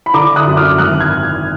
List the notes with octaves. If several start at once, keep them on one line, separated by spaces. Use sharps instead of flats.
B5
D3 A#5 D6
D#6 F#6
F#2
D6 F6
G#1 D#6 F#6
F6 G#6